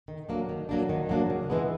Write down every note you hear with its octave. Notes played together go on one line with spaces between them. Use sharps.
D#3
F#3 A#3 D4
D#3
F#3 A#3 D4
D#3
F#3 A#3 D4
C#3
E3 G#3 B3